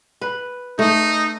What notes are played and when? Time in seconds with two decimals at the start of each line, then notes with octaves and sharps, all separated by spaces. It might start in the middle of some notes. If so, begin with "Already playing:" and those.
0.21 B4
0.79 A3 D#4